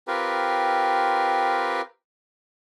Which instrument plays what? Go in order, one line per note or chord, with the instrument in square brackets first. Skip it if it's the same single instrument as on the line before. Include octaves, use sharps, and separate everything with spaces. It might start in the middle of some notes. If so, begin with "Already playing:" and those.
[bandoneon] C4 F4 G4 A#4 B4